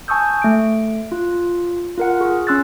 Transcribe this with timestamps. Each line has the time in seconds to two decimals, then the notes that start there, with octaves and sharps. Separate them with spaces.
0.08 G#5 A5 C#6 D#6 E6 G6
0.42 A3 D7
1.12 F4
1.97 F4 A#4 F#5
2.21 G#4 C#6
2.47 C#4 C6 E6 F#6 A6